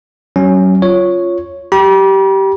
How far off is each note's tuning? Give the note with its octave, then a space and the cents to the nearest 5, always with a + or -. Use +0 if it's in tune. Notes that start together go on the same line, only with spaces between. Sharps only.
F#3 +30 C#4 +0
F4 +0 C#5 +0
G4 -15 B5 -45